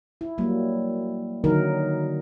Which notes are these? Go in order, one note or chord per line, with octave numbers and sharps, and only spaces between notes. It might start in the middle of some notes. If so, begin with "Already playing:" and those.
E4
F#3 G3 A#3
D3 D#3 F#3 D#4 A#4